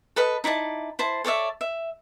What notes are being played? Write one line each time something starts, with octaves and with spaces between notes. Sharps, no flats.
A4 B4 D#5 B5
D#4 E4 D5 A5
E4 C5 A5
A4 C#5 D5 E5
E5